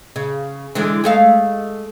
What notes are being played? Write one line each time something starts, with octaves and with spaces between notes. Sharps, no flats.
C#3
D3 E3 G#3
G#3 A3 F5